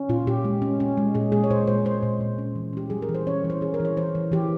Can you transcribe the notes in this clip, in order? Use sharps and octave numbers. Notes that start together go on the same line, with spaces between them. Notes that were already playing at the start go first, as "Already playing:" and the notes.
Already playing: C#4
A#2 F4
A#2 G4
G#3
C#4
C#4
G#3
A#2 G#4
G#3 G#4
C#5
A#2 C5
G#3 C5
G#3 C5
A#2
A#2
C#4
E3
C#4 G4
G3 G#4
A#4
E3
C5
C#4 C#5
E3
C5
C#4 G#4
A#4
E3
C#5
E3 C5
E3
E3 G4